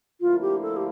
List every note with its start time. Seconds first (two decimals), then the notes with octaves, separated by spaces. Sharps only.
0.21 D2 D3 F3 A#3 E4 F4
0.42 G4
0.63 A4
0.77 G4